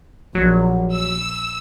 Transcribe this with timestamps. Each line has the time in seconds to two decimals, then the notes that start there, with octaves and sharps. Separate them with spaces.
0.35 A#1 F#3
0.93 E6